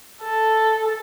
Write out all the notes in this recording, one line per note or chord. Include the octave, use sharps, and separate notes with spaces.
A4